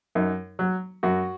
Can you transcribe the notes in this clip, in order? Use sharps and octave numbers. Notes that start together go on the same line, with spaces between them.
F#2 D#4
F#3
F#2 F#4